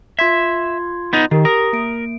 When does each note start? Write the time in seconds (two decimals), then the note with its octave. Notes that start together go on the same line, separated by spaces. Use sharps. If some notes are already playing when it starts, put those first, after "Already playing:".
0.19 F4 E5 C6 G#6
1.13 B3 D#4
1.31 D#3 G4 A#4
1.45 A#4 D#6
1.73 A#3 D7